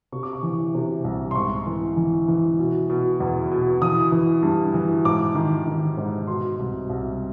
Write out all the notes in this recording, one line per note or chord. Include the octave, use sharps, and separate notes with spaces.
C3 C#6
D6
C#6
E3
C3
C2
C6
G#2 C#6
E3
E3
E3
B2
B2
E2
B2
E3 D#6
E3
G2
E3
G#2 D6
D#3
D#3
G#2
B2 C6
C2
C2